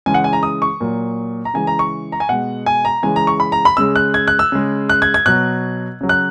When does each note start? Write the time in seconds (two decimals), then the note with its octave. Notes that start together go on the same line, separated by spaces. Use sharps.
0.06 C#3 E3 G#3 G#5
0.14 F#5
0.24 G#5
0.33 A#5
0.43 D#6
0.62 C#6
0.81 A#2 F#3
1.45 A#5
1.54 C#3 E3 G#3 G#5
1.67 A#5
1.79 C#6
2.12 A#5
2.20 G#5
2.29 B2 G#3 F#5
2.66 G#5
2.85 A#5
3.03 C#3 E3 G#3 G#5
3.16 A#5
3.27 C#6
3.40 B5
3.52 A#5
3.65 B5
3.77 C#3 G#3 E6
3.96 F#6
4.14 G#6
4.28 F#6
4.39 E6
4.52 C#3 G#3
4.89 F#6
5.02 G#6
5.14 G#6
5.26 B2 F#3 F#6
6.01 C#3 F#3
6.09 F#6